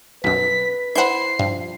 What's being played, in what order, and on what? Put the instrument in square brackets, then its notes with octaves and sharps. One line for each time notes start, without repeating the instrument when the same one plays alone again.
[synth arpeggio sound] B1 F#2 [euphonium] B4 [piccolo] B6
[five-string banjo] E4 C5 B5 [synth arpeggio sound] F#5 G6 [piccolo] C7
[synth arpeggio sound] G2 [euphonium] F3